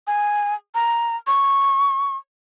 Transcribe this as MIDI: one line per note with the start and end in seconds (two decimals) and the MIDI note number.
0.07 0.54 80
0.75 1.16 82
1.27 2.16 85